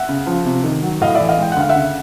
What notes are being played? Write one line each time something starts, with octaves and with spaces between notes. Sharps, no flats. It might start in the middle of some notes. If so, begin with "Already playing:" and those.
Already playing: E5 F#5
C#3
F3
C3
D#3
F#3
A2 D#5 F5
E3 D5 E5
D#5 F5
G#3 G5
F#5
D2 F5
E5 F#5
C#3